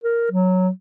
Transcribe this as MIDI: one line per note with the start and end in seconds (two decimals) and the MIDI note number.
0.04 0.31 70
0.31 0.69 54